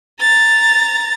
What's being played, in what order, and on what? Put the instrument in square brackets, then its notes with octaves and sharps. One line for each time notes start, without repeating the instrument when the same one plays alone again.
[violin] A#5 A6